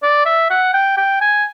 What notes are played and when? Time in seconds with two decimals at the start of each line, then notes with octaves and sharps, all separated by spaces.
0.03 D5
0.26 E5
0.50 F#5
0.74 G5
0.97 G5
1.21 G#5